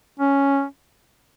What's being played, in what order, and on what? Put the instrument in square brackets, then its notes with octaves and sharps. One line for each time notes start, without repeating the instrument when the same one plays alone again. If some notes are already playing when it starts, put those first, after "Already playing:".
[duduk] C#4